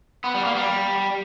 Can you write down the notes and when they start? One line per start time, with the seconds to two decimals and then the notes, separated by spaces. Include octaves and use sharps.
0.24 B3
0.34 G3
0.45 A#3
0.55 G3